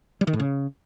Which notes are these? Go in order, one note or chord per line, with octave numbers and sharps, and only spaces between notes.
G3
D#3
A2
C#3